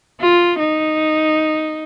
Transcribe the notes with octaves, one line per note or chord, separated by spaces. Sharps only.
F4
D#4